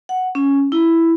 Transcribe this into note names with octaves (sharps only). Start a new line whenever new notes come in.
F#5
C#4
E4